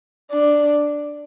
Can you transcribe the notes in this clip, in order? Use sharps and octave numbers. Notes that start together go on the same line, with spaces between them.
D4